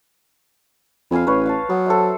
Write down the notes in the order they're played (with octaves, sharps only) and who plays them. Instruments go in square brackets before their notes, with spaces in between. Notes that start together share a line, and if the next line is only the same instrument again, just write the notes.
[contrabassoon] F2 [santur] F5 G#5 B5
[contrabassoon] A1 [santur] B4 C#5 F5
[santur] F5 A5
[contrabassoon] F#3 [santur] B3
[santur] A4 C5 E5